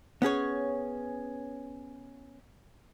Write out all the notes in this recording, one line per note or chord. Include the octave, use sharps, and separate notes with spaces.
B3 C#4 G#4 C#5